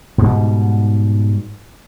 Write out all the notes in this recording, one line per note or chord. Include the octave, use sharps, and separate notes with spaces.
G#2 B2 G3